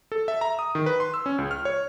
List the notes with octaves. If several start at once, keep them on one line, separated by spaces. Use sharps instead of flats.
A4
E5
A#5
D#6
D#3
B4
C6
E6
C#4
C#2
F6
C#5